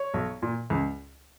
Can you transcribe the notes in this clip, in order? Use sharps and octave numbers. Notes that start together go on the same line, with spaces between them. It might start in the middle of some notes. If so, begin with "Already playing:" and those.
Already playing: C#5
B1
A#2
C#2